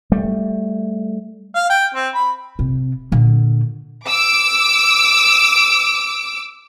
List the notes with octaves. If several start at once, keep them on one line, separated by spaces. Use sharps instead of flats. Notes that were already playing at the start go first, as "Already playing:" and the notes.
G3 A3
F5
G5
C4
B5
C3
A#2 D3
D6 E6 D7